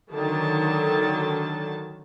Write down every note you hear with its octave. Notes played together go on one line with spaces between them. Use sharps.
D3 D#3 F#3 A5